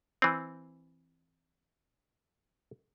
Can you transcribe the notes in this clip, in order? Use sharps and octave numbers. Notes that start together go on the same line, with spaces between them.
E3 C4